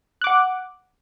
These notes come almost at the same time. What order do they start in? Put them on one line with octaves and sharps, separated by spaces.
F#6 D6 F#5